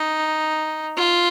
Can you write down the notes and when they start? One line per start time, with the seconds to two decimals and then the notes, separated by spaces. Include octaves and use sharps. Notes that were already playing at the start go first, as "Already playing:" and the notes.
Already playing: D#4
0.97 F4